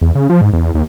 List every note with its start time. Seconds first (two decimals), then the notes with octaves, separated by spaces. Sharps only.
0.01 E2
0.15 C#3
0.30 F3
0.41 G#2
0.53 E2
0.75 D#2